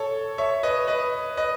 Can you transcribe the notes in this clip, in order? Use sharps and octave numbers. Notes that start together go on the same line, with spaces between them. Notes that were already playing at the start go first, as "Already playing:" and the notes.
Already playing: A4 C#5
C#5 E5
B4 D#5
B4 D#5
B4 D#5